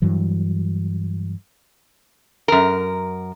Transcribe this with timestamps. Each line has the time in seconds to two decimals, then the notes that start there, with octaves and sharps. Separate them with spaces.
0.02 G2 E3 F#3
2.48 F#2 A#4